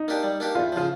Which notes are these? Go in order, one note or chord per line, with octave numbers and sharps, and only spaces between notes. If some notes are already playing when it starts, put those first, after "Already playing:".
Already playing: D#4
A#3 D4 G4
G3
A#3 D4 G4
E2 F4
C#3 F3 F4